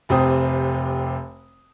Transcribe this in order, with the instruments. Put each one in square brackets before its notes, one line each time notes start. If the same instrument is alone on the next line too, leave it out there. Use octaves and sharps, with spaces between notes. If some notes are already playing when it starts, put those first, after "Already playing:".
[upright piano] F1 C3 C4 D#6